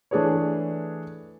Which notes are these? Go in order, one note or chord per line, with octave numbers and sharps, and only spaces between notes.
E3 A3 D4 G#4 B4 C#5